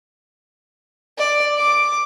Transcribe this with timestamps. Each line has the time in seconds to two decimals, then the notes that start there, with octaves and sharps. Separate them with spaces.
1.18 D5
1.57 D6